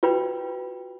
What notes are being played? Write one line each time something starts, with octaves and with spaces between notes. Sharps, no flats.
F4 F#4 B4 G5 B5